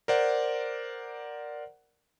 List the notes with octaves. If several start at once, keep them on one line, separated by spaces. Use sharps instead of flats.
A#4 C5 D5 F#5